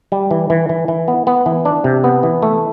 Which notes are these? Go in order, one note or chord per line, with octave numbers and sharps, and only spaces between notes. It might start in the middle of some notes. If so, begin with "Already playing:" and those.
G3
E3
E3
E3
E3
B3
B3
E3
D4
C3
B3
E3
A3